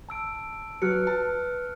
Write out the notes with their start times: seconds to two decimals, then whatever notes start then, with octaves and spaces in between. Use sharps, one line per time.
0.09 A5 E6 D7
0.82 F#3 B4 F6 F#6 C#7
1.07 A5